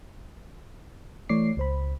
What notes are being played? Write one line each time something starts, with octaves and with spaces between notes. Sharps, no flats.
E3 A3 C#5 D5 D6 C7
C#2 C5 B5